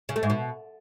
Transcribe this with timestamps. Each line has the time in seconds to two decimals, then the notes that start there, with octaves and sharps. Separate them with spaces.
0.09 C#3
0.16 A3
0.23 G#2
0.30 B2